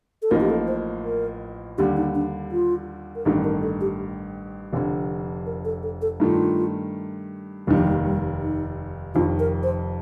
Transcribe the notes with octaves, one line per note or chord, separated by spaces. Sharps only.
A4
A1 A2 F3 A#3 D#4 A#4
G4
A4
C5
A#4
D#2 D3 G3 G4
D#4
D4
F4
A#4
A1 G2 D#3 A3 A4
A#4
A4
G4
F1 F2 D3
A#4
A4
A4
A4
G2 D#3 A3 F4
F1 D#2 D#3 G3
F3
G3
G3
D#4
F1 F2 D#3 F4
A#4
C5